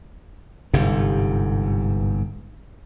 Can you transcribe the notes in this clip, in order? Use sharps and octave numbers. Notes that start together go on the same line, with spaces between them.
G1 G#2 C3